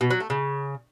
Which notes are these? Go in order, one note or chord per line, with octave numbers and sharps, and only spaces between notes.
B2
F#3
A3
C#3